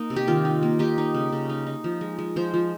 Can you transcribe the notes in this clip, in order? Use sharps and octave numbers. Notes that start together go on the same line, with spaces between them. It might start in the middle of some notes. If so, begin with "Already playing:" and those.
Already playing: A#3 D#4
C3
G4
D#3 F4
D#4
A#3
D#4 G4
D#4
C#3
C#3
D#4
D#4
F3
G#3
G#3
F3 C5
F3